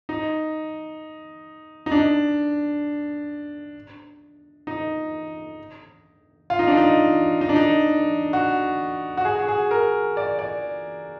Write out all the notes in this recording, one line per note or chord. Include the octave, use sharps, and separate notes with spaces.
D#4
D#4
D4
D#4
F4
D#4
D4
D#4
D#4
D4
D#4
F#4
F#4
G#4
F#4
G#4
A#4
D5
D5